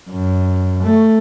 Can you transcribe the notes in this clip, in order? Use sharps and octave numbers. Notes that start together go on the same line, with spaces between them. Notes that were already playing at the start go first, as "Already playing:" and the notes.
F#2
A3